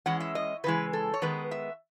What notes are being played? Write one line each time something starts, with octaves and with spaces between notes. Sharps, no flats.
E3 G#3 C#4 F#5
E5
D#5
C#3 E3 G#3 B4
A4
C#5
D#3 G#3 B3 B4
E5